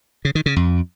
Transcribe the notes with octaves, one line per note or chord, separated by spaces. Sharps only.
C#3
D#3
C#3
F2